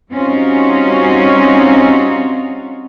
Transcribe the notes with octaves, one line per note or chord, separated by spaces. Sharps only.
G3 C4 C#4 D#4 F4 F#4